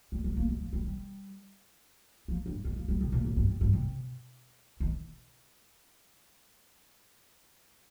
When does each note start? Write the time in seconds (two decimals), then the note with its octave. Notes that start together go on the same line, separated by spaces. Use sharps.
0.12 G3
0.24 G3
0.37 A#3
0.48 G3
0.60 F3
0.73 G3
0.84 G3
2.28 F3
2.46 G2
2.64 F2
2.76 F3
2.88 G3
3.01 C3
3.12 A#2
3.25 A#2
3.36 G2
3.49 F2
3.61 G2
3.73 C3
4.80 D#3